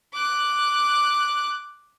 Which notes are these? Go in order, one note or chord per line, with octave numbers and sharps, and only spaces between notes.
D6 F#6